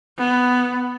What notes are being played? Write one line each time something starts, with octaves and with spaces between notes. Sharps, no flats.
B3